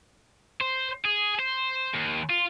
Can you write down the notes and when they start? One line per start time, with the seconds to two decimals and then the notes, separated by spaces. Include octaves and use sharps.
0.61 C5
1.05 G#4
1.39 C5
1.93 D#2
2.30 F4